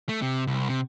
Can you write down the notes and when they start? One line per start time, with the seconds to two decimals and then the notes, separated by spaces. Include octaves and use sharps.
0.09 A3
0.22 C3
0.47 C2
0.69 C3